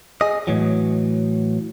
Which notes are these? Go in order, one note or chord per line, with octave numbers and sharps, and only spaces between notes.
G#4 D#5
A2 E3 F#3